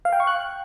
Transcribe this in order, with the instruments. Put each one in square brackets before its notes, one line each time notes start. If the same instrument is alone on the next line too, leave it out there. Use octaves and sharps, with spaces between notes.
[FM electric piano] F5
G5
C#6
F#6